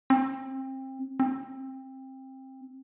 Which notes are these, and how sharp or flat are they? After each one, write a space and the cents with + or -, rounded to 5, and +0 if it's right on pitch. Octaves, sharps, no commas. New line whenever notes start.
C4 +25
C4 +20